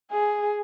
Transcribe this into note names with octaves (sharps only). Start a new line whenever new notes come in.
G#4